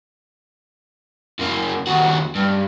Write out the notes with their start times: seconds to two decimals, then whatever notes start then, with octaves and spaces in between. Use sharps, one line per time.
1.39 F#2 A#3
1.87 D#2 F#4
2.35 G2